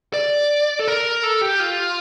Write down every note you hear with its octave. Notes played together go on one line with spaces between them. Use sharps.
D5
A4
A#4
A4
G4
F4